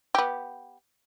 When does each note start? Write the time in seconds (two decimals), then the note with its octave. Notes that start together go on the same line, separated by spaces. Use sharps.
0.15 B3 G4